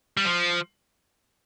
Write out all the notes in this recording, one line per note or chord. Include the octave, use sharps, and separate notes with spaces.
G3
F3